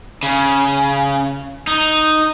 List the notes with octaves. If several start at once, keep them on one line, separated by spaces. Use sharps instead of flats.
C#3
D#4